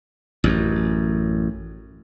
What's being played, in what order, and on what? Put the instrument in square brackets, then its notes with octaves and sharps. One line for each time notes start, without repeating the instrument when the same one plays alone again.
[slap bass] A1 F#2